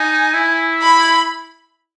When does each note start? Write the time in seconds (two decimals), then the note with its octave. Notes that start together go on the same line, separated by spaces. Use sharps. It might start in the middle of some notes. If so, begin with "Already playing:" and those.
Already playing: D#4 G#5
0.34 E4
0.82 B5